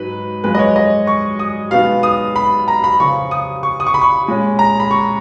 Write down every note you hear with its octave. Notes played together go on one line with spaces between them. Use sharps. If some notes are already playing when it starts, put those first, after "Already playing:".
Already playing: G#2 F#3 D#4 B4
F#2 F3 G#3 B4
D#5
C#5
D#5
C#6
D#6
B2 G#3 B3 D#4 F5
D#6
B5
A#5
B5
F2 C#3 F3 C#6
D#6
C#6
D#6
C#6
B5
C#6
A#2 G#3 C#4
A#5
B5
C#6